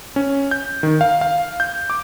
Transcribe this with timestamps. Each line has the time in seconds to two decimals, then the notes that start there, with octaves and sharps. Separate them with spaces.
0.16 C#4
0.51 G6
0.83 D#3
1.01 F5
1.21 F5
1.60 G6
1.90 D6